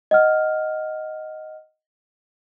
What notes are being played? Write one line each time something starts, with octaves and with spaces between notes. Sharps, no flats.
D#5 F#5 F6